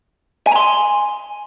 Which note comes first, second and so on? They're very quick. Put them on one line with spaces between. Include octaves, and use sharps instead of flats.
G#5 A#5 C6